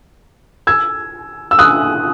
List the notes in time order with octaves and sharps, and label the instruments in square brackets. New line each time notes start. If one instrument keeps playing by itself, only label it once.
[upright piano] E6 G#6
E6
D#6 F#6